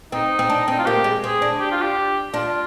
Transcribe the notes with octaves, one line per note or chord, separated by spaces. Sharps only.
C4 D#4
C4
D4
C4 D#4
F4
A#3 G4
G#3
C4 G#4
D4
G4
F4
G4
D4 F4